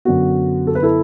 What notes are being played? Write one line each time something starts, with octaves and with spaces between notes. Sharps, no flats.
F#2 D3 B3 F#4
A4
B4
E4 A4